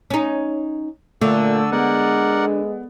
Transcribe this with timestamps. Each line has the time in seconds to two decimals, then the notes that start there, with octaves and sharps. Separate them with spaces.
0.10 C#4 D#4
1.22 A#2 D3 A3 A4 D5 E6
1.72 G#3 B3 A#4 D5 F#5